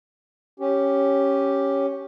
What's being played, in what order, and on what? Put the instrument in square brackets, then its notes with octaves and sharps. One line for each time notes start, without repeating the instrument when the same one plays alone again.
[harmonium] C#4 G4